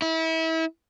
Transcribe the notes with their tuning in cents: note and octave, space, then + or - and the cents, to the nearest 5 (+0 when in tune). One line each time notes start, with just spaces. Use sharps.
E4 -30